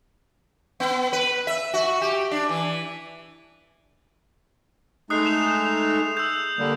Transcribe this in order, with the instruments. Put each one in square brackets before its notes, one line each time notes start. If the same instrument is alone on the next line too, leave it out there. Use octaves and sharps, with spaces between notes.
[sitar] B3
B4
E5
F#4
G4
D4
E3
[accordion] G#3 A3 D#4 [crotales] D#6 F#6 C7
[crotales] E7 F7
E6 G6
[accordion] D3 G3 A#3